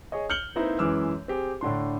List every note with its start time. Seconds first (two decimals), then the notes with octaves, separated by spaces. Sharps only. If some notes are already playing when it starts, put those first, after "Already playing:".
0.12 G#4 C#5 D#5
0.30 F6 G6 C#7 F#7 G7
0.56 A#3 C4 D#4 E4 B4 C5
0.79 F#2 E3 G#3 D6 E6 F6
1.28 C4 G4 G#4
1.61 A2 D3 D4 C6